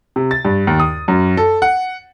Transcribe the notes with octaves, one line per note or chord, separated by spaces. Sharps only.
C3
A6
G2
D#2
D#6
F#2
A4
F#5